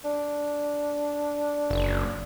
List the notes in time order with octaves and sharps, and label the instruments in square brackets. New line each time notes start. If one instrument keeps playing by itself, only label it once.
[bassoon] D4
[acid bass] F#1